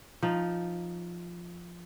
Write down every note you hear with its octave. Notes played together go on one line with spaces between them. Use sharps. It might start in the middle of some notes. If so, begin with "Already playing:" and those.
F3 D#4